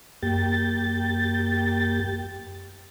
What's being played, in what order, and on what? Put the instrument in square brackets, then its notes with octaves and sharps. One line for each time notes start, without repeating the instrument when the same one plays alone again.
[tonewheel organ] F#2 A#3 G4 G5 A6